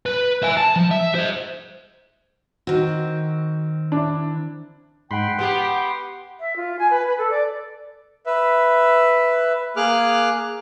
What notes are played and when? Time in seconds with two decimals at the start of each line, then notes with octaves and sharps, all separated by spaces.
0.06 B4
0.43 E5 G#5
0.57 A5
0.76 F3
0.91 E5
1.15 C5 D#5
2.67 D#3 C4 F#4
3.92 D4 E4
5.11 G#2 F#5 G5 B5 C6
5.39 B3 G4 C6
6.40 E5
6.56 F4
6.79 G#5
6.90 B4
7.06 B4
7.18 A4
7.30 D5
8.26 B4 E5
9.76 A#3 G#4 D6 F6 F#6